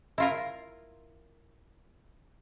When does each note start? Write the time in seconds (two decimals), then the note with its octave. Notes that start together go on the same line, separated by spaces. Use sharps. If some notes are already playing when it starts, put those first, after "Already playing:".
0.18 E4 F4 A#4